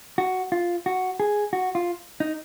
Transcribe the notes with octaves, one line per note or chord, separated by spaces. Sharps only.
F#4
F4
F#4
G#4
F#4
F4
D#4